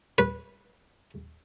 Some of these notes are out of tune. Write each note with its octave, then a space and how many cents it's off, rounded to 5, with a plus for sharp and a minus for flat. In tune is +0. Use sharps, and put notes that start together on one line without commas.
B4 -15